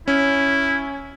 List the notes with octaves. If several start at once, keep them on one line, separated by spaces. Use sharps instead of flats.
C#4 E4